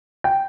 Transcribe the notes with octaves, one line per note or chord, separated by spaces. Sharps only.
G5